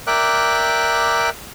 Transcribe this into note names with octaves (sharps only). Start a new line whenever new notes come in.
A#4 D5 E5 G5 D6 F#6